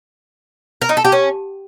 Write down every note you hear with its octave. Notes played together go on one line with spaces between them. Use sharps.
A#4
D#4
A4
G4
C#4